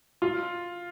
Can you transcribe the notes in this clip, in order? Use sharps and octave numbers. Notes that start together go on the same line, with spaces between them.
F4